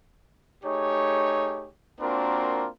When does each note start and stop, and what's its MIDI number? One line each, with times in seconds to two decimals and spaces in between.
0.65 1.69 57
0.65 1.69 63
0.65 1.69 67
0.65 1.69 68
0.65 1.69 73
2.00 2.68 58
2.00 2.68 60
2.00 2.68 62
2.00 2.68 65
2.00 2.68 66
2.00 2.68 70